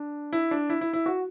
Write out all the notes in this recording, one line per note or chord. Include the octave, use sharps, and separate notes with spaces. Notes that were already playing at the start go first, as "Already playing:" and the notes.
Already playing: D4
E4
D4
E4
E4
E4
F#4